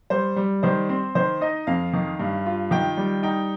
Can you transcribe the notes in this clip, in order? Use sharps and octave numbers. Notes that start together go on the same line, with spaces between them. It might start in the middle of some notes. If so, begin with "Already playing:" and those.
G3 C5
G3
D#3 C5
C4
D#3 C5
D#4 D#5
F2 F5
D#3
G2
F4
D#3 G5
G3
D#4 G5